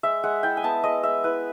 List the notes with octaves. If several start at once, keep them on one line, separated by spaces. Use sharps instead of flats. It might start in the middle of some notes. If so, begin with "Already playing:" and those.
G#3 E5
G#3 F#5
E4 G5
G#5
B3 A5
G#3 D#5
G#3 E5
E4 B4